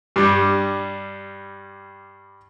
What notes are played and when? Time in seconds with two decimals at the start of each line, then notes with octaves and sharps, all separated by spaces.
0.16 G2 G3